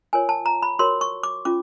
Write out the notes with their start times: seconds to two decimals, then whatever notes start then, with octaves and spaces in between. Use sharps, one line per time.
0.13 F4 A#4 C#5 G#5
0.29 A5
0.46 A#5
0.63 B5
0.79 F#4 A#4 C#5 C6
1.01 C#6
1.23 D6
1.45 C#4 F4 D6